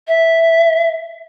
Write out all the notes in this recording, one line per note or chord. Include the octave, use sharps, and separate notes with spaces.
E5